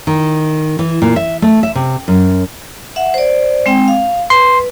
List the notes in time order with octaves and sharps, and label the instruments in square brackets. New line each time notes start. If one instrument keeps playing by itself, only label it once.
[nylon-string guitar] D#3
E3
A#2
E5
A3
E5
C3
F#2
[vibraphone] E5 F#5
C5 D5
G#3 C4 G5
F5
[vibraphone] B4 [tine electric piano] C6